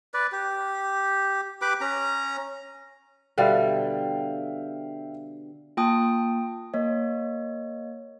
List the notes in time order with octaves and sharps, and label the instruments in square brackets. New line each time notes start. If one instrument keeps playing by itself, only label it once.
[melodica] B4 D5
G4
G4 B4 B5 D6
C#4 A#5
[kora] B2 D3 G3 [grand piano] E5 F5 G5
[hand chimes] A#3 A5 [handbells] F4 G5 D#6
[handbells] A#3 C#5 [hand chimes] D#5